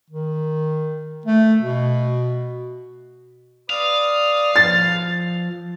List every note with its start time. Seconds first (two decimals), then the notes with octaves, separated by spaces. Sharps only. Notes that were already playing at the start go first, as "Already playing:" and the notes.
0.10 D#3
1.26 A3
1.62 B2
3.70 B4 D5 F5 D#6
4.56 F3 A6